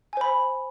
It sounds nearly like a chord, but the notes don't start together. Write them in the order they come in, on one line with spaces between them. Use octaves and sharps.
G#5 C5 B5